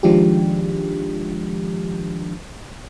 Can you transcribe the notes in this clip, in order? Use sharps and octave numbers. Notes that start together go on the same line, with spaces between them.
D#3 F3 G#3 D4 F4 G4